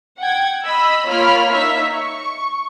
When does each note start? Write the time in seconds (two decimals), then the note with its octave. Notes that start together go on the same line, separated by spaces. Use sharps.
0.18 F#5 G5 G#6
0.63 D#5 B5 E6
1.05 A#3 F4 C#5 B5 F6
1.52 D#4 C#5 E5
1.91 C#6